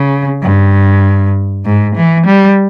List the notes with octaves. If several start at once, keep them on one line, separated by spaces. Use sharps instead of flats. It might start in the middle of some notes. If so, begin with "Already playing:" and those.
Already playing: C#3
G2
G#2
E3
G3